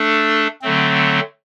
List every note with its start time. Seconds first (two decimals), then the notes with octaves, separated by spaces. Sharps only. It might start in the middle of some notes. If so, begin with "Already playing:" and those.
Already playing: A3 D4 A4
0.62 D3 F#3 A3 C4